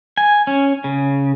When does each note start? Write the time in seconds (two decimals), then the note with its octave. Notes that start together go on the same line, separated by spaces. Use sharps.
0.17 G#5
0.47 C#4
0.84 C#3